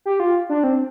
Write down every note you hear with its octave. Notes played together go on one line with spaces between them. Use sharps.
G4
F4
D4
C4